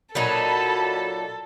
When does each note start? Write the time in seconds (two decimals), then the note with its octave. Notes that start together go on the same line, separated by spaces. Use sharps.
0.15 A#2 F#3 D#4 A4 A5 B5